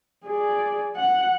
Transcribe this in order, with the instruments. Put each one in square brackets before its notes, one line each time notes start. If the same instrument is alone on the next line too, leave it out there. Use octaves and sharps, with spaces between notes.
[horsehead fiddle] G#4 D5
F#5